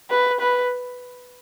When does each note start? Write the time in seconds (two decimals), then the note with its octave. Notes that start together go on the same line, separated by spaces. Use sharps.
0.10 B4
0.40 B4